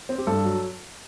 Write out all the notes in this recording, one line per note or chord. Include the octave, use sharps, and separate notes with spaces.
C4
G4
G2 A4
F#3